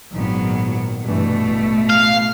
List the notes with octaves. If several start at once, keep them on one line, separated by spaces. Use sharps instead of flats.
G#1 A#2 D#3 F#3 B3
G2 B2 E3 A3
A1
F5